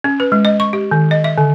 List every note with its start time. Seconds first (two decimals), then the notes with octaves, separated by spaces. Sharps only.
0.04 C#4
0.20 B4
0.32 G#3
0.45 D#5
0.60 C#6
0.73 G4
0.91 D#3
1.11 D#5
1.24 E5
1.38 D3